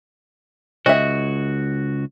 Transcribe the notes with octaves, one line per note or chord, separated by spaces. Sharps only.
C#2 F#4 D#5 E5